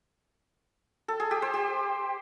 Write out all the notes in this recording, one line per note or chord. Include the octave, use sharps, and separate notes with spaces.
A4
G#4
G4
C5
G4